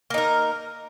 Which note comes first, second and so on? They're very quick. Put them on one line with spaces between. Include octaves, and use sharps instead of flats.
A#3 D#4 A#4